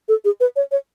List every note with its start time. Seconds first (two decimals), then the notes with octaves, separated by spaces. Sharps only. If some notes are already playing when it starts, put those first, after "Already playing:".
0.08 A4
0.25 G#4
0.40 B4
0.56 C#5
0.72 C#5